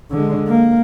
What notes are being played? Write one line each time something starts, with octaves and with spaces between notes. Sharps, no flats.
D3 G#3
A#3